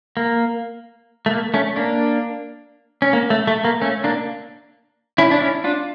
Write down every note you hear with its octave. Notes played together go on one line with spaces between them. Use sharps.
A#3
A3
A#3
A3 C#4
A#3 D4
C#4
A#3
A3
A3
A#3
A3 C#4
A#3 D4
C#4 E4
D4
C#4 E4
D4 F4